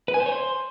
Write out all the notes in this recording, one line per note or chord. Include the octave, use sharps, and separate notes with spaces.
B4
G#5
C5
C#5
C5